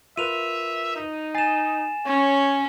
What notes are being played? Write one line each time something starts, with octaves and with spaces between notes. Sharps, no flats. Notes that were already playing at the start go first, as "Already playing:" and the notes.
F4 A#4 B4 E5 D#7 F7
D#4
G#5 A6 C7 E7
C#4 C#5